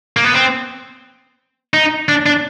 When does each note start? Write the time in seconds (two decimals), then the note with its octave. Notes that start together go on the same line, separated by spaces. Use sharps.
0.17 A#3
0.24 B3
0.34 C4
1.74 D#4
2.09 D4
2.26 D4